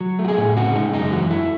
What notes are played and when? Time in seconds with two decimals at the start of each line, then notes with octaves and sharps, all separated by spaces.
0.01 F#3
0.19 A3
0.25 F#4
0.28 G#4
0.38 A2
0.56 C#3 F#4
0.75 G#3 D#4
0.93 F#2 D#4
1.12 E3 F#4
1.31 A3 E4